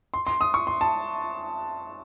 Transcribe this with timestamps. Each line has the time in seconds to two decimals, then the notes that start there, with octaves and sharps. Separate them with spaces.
0.14 C6
0.27 C6
0.41 D#6
0.54 C#6
0.67 C6
0.81 A5